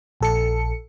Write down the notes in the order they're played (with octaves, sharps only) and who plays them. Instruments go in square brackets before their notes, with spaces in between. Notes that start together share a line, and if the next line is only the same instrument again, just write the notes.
[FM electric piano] A#1 A4 C#7